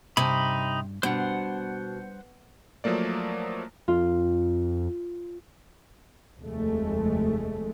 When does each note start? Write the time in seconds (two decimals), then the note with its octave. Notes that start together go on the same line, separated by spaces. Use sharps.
0.17 G2 C3 D#4 A5 B5
1.03 B2 G3 B3 D4 C5 F#5
2.84 F3 F#3 A3 A#3 D5
3.88 F2 F4
6.41 F1 D#2 G#3 A3